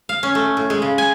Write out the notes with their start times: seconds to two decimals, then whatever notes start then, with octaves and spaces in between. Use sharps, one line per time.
0.09 F5
0.23 C#4
0.35 A3
0.57 A2
0.70 G#3
0.82 C#3
0.98 G#5